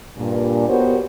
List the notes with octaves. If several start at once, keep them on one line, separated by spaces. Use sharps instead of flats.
G2 A#2
B3 F#4 G4 A#4 C5 C#5